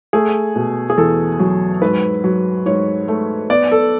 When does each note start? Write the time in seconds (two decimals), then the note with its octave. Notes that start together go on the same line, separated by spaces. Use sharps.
0.13 A3 G#4
0.56 B2
0.90 G#4
0.97 E2 A4
1.39 F#3
1.82 G#2 B4
2.24 F#3
2.66 G#2 C#5
3.08 A3
3.50 B3 D5
3.71 A4